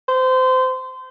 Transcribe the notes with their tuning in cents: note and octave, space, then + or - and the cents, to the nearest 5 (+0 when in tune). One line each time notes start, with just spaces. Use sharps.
C5 -25